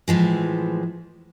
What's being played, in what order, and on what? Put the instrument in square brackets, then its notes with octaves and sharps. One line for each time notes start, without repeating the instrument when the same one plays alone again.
[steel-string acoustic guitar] A2 E3 F3 G#3